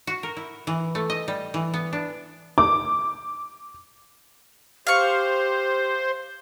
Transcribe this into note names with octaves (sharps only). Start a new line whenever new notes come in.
F#4
A#4
E4
E3
A3
D#5
G3
E3
B3
D4
D6
G4 C5 F5 C#6